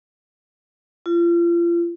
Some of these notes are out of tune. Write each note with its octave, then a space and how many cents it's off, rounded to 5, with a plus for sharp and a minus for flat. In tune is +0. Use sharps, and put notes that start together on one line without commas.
F4 -35